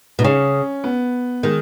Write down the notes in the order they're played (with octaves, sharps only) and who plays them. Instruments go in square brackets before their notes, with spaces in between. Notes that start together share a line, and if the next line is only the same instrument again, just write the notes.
[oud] B2 [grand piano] D#4
[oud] C#3 [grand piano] C#4
[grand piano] B3
[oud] D#3 [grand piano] G#3